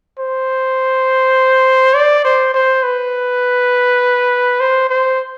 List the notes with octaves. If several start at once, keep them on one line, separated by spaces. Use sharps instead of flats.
C5
D5
C5
C5
B4
C5
C5